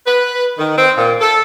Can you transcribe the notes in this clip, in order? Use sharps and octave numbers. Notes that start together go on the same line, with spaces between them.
B4
D#3
C4
A#2
A4